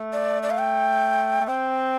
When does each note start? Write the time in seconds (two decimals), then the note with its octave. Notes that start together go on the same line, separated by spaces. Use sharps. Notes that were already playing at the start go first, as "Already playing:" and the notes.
Already playing: A3
0.13 D5
0.43 D5
0.50 F5
0.58 G5
1.41 A3
1.47 C4 G5